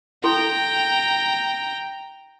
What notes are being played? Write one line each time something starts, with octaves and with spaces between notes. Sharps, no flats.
E4 A4 G5 A#5 C6